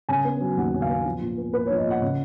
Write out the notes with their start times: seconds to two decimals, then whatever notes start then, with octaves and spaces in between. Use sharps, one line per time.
0.09 C#3 G#5
0.25 B3
0.41 F#3
0.57 D#2 F#5
0.74 C#3
0.82 F5
0.89 B3
1.05 F3
1.21 A#2
1.38 B3
1.53 A#2 B4
1.66 C#5
1.70 F3
1.77 D#5
1.86 A#2 F#5
2.02 C#3